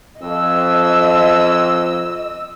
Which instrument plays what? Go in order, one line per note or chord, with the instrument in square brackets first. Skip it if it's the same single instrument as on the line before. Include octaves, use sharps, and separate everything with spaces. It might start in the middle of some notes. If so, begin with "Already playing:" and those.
[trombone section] F2 [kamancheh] D#5 E6